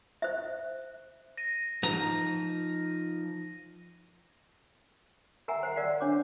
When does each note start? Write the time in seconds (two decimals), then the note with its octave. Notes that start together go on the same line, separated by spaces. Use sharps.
0.22 C5 E5
1.37 A#6 D#7
1.83 F3 D#4 A#5
5.48 A#4 E5 F#5 G#5 A#5
5.63 C5 F#5
5.76 A#4 D5 F5 F#5
6.01 D4 C#5 D6